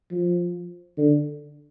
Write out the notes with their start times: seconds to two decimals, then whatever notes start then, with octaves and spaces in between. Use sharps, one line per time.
0.11 F3
0.98 D3